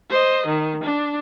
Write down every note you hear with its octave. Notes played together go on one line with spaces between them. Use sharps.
C5 D#5
D#3
D4